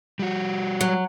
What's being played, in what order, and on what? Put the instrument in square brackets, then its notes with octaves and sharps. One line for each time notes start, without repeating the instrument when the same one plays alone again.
[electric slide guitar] G3 F#4
[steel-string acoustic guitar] F#3